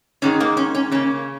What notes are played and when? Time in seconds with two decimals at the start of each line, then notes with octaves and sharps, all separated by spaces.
0.22 G#2 D#3 G#3 C#4
0.40 A#3
0.57 C#4
0.75 C#4
0.91 C#3 A#3 C#4